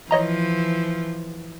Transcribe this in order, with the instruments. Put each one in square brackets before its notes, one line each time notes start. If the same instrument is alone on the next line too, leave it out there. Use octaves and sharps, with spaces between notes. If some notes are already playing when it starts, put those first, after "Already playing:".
[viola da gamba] E3 F3 [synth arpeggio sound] C#5 D#5 A#5